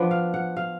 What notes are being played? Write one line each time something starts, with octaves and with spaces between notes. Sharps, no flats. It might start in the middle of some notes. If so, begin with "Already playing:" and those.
Already playing: F3 B3 D4 D5
F5
F#5
F5